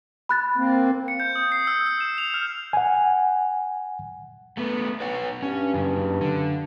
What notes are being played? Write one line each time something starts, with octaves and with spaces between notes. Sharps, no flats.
B5 F#6 A6
A#3 C4
C#7
G6
D#6
C7
E6
E6
E7
F7
F6
F#5 G#5
A3 B3
B4 C#5 F#5
G2 C#4
F#2 C#3
D3